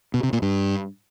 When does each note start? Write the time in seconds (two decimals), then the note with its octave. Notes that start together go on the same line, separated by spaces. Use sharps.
0.14 B2
0.23 C3
0.33 A#2
0.42 G2